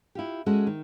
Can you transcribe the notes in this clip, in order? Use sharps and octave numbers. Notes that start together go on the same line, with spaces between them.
E4 F4 G4
G#3 C#4 F#4 A4
D#3